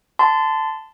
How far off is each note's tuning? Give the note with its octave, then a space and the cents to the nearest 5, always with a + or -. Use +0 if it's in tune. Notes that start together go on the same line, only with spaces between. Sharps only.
A5 +0 C6 -30